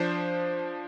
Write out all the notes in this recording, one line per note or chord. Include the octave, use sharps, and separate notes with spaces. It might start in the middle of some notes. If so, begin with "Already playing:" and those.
Already playing: F3 D4 C5